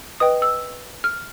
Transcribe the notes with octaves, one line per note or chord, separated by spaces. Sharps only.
B4 D#5 G5 D#6
E6
F6